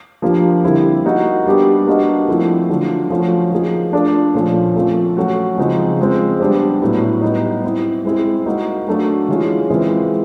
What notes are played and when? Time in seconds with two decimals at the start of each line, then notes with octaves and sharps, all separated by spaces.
0.22 F3 A#3 D4 G4
0.63 D3 G3 C4 E4 G4
1.05 A#3 D#4 F#4
1.46 G3 B3 D4 G4
1.87 A#3 D4 F#4 B4 D#5
2.28 F3 A3 C4 E4
2.69 D3 F#3 A3 D4 F4
3.10 F3 A3 C#4 F#4
3.52 F3 A#3 D#4 G#4
3.93 A3 D4 F4 A4 D5
4.34 A#2 F3 A3 C#4
4.75 F3 A3 C4
5.17 F#3 A3 C#4 F#4
5.58 C#3 F3 G#3 C4 D#4
5.99 F3 G#3 C4
6.40 G3 B3 D4 G4 C5
6.81 A2 F#3 B3 E4
7.22 G3 B3 D#4
7.64 G3 C4 E4
8.05 G#3 C4 E4 G#4
8.46 A#3 D#4 F#4
8.87 F#3 A3 D4 F#4
9.28 E3 G#3 C#4 F4 G#4
9.69 E3 G#3 C4 F4 A#4